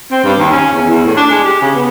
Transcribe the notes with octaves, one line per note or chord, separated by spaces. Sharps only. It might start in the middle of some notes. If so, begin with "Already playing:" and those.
C4
G2
D#2
C#4
E2
E2
A2
D4
G#3
G4
C#3
B3